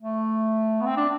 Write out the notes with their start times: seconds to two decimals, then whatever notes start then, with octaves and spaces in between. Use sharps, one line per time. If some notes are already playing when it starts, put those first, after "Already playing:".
0.01 A3
0.81 B3
0.86 C4
0.97 D4